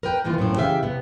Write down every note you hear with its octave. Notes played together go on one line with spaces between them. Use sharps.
A#4 B4 G5
C3 D#3 E3 A#3 F4
F#2 A2 A#3 C4
C#3 E3 G4 E5 F5
C3 B3